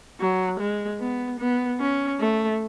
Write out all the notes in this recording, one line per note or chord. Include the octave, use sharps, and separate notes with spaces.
F#3
G#3
B3
B3
C#4
A3